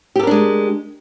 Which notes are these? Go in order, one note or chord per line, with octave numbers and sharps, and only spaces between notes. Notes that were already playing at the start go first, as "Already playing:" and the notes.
G#3 D4 G4 A4 A#4